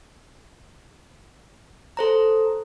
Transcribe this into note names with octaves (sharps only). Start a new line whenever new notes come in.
A4 C5 A#5